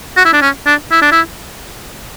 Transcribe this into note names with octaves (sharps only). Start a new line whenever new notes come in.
F#4
E4
D4
C#4
D4
E4
D4
E4